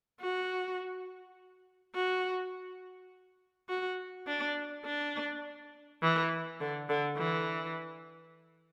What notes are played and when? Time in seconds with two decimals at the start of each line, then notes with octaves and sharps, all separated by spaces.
0.21 F#4
1.95 F#4
3.69 F#4
4.27 D4
4.86 D4
6.03 E3
6.61 D3
6.89 D3
7.18 E3